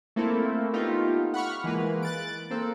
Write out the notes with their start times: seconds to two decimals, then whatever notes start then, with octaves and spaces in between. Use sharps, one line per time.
0.16 A3 A#3 C4 E4 A4
0.73 A3 B3 D#4 F4 G4
1.34 F#5 B5 C#6 F6
1.64 E3 G#3 A#3 B4
2.03 F#6 A6 D7
2.51 A#3 C4 A4